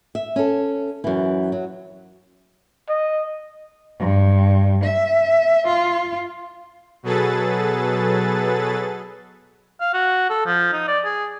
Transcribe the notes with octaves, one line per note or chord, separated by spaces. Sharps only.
E5
C#4 A4
F#2 E3
F#3
D#5
G2
E5
F4
B2 F#3 G#4 A4 B4 A6
F5
F#4
A4
F3
D#4
D5
G#4